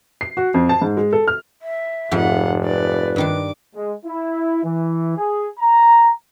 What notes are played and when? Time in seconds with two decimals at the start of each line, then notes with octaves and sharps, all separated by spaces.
0.21 C7
0.37 F#4
0.54 F2
0.69 A5
0.82 G#2
0.97 G#3
1.13 A4
1.28 F6
1.62 E5
2.11 F1 F2 G#2 F3 F4 F#5
2.64 B4 D5
3.16 G2 D#3 D4 D6
3.75 G#3
4.06 E4
4.64 E3
5.17 G#4
5.59 A#5